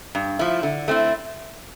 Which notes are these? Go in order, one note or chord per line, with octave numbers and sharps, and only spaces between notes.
G2
F3 A3 E4
D3
A3 C4 E4